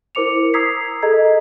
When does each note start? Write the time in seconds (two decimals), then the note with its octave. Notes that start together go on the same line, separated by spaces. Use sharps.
0.15 E4 A#4 C5 D6 C#7 F7
0.54 A#5 D#6 E6 G#6 B6 C7
1.03 G#4 A4 D#5 A#5 G#6